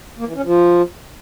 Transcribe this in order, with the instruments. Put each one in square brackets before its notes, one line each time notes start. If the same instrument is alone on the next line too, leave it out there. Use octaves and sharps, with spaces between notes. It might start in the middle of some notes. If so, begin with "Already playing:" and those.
[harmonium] A#3
E3
C#4
F3